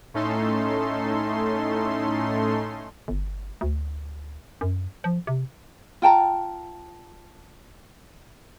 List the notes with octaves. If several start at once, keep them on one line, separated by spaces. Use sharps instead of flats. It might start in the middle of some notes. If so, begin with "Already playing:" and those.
A2 A3 C#4 D#4 A4 C6
G1
D2
F#2
F3
C3
F4 G5 A5 A#5